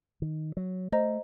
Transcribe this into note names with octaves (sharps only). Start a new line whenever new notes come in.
D#3
F#3
A3 C5 D#5 A#5